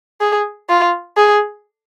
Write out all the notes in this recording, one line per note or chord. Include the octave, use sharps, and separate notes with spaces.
G#4
F4
G#4